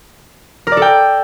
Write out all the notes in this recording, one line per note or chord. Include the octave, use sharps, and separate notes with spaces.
A#4
D5
A4
G5